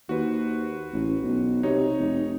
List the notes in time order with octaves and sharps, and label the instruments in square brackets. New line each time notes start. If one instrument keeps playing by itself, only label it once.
[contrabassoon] D#2 [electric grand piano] F#4 B4 C5
[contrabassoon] A1
B1
[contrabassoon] C3 [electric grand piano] D#4 C#5
[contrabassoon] F1